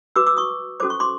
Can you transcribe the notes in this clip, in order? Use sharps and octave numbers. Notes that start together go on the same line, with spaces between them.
F#4 B4 D6 E6
D6 E6
C#6 D#6
C#4 F#4 A4 C5 D6
C#6
C6 D6